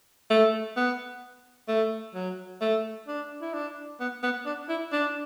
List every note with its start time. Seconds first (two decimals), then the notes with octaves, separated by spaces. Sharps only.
0.30 A3
0.77 B3
1.68 A3
2.15 F#3
2.61 A3
3.08 D4
3.41 E4
3.53 D4
4.00 B3
4.23 B3
4.46 D4
4.69 E4
4.92 D4